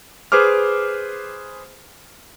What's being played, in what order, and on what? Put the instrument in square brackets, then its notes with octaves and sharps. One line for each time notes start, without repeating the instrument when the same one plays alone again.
[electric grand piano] G#4 B4 C5 D6 F6